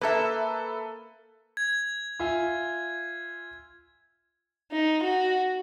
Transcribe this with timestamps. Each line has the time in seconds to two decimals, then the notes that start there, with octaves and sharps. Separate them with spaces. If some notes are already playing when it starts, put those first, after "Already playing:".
0.01 A#3 A4 B4 E5
1.57 G#6
2.20 F4 E5 G#5
4.72 D#4
5.03 F#4